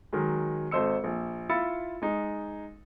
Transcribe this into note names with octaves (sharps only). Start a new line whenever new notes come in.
D#3 F#3 G#3
G#1 A4 C5 D#5 E6 C#7
A#1
E4 F4 B5 E6 A6 C#7
G#3 D#4